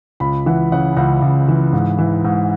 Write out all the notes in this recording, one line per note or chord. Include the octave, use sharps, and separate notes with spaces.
C#2 B5
E3 F#5
C#3 F#5
C#2 F#5
C#2
E3
G#2
E3
G#2